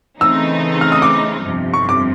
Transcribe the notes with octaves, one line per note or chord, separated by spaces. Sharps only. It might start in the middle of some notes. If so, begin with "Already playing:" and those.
C#3 E3 A3 C4 D#4 E6
F6
D#6
D6
G1 F2 C3 F3
C#6
D6